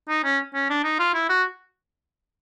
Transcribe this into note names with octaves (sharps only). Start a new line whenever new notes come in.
D#4
C#4
C#4
D4
D#4
F4
E4
F#4